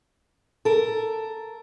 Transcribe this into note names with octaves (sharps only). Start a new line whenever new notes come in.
A4 A#4